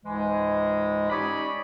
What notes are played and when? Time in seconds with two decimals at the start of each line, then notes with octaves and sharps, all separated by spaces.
0.05 C#2 G#2 E3 G#3
1.10 C#4 D#4 G4 C#5 D5 B5